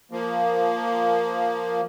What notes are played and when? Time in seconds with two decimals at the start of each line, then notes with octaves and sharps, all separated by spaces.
0.11 F3 A#3